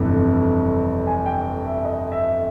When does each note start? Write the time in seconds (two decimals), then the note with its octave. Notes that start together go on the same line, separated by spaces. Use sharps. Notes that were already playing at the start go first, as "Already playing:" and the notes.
Already playing: G1 F2 C3 E3 A3
1.07 G#5
1.26 G5
1.65 E5
1.85 D#5
2.12 E5